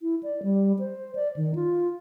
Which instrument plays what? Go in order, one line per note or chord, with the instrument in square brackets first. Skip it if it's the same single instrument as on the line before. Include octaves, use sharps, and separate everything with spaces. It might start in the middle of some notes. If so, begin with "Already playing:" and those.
[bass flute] E4
D5
G3
C5
D5
D#3
F4